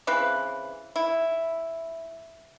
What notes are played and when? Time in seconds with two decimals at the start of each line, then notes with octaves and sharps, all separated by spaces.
0.07 C#3 E3 C4 B4
0.96 E4